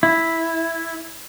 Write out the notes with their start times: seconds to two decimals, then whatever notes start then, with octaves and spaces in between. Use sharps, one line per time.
0.03 E4